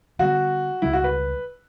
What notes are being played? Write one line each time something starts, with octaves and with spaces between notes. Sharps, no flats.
D2 D3 G3 B3 F#4
C#2 C#3 G3 E4
F#4
B4